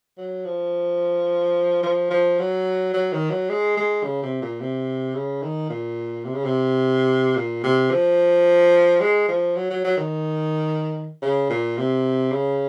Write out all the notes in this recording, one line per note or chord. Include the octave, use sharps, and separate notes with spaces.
F#3
F3
F3
F3
F#3
F#3
D#3
F#3
G#3
G#3
C#3
C3
A#2
C3
C#3
D#3
A#2
C3
C#3
C3
A#2
C3
F3
G#3
F3
F#3
F#3
F#3
D#3
C#3
A#2
C3
C#3